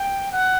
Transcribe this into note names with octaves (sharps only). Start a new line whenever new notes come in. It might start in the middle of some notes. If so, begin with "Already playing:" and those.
Already playing: G5
F#5